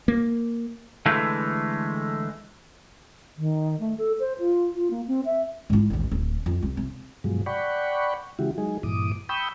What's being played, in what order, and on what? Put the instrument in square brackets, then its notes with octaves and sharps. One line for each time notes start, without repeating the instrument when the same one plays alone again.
[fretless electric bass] A#3
[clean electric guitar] D3 E3 G#3 A3
[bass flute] D#3
A3
A4
C5
F4
F4
A#3
C4
E5
[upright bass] G#2 E4
A1 D#2
D1
F2
C2
C3
[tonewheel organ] G2 B2 F3 F#3 G#3
D5 F#5 G5 B5 C#6
C#3 E3 G#3 E4 F#4 G4
F#3 G#3 D#4 G#4
G2 A#2 E3 D6 D#6
G5 B5 C#6 D#6 E6 G6